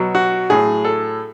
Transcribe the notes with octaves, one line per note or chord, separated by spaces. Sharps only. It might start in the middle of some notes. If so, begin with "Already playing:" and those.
Already playing: B2 F#3
F#4
A2 F#3 G#4
A4